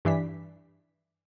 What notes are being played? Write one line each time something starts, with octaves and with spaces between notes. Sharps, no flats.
G2 E3 D4 B6